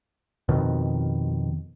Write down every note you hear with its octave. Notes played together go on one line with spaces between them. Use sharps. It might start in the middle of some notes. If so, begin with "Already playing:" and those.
F2 B2 D#3